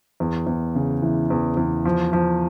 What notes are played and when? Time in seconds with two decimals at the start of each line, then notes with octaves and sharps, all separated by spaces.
0.20 E2
0.47 E2
0.75 C#3
1.02 E3
1.30 E2
1.57 E2
1.85 F3
2.13 F3